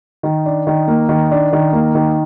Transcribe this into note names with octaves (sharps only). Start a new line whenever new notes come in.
D#3
D4
D#3
A#3
D#3
D4
D#3
A#3
D#3